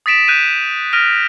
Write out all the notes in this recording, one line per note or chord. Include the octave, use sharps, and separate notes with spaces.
D#6 A6 B6 D7 E7
F#6 G6 D#7 F7
F6 A#6 D7 D#7 F7